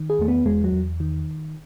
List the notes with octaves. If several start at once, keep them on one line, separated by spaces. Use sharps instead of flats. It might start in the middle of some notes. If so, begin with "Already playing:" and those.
Already playing: D#3
G#4
E2 A3
B3
E2 G#3
F#3
E2
D#3